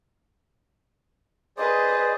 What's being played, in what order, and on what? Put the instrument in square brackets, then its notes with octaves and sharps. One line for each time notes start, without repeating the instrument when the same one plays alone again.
[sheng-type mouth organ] G#4 C5 D5 [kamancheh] B4 D#5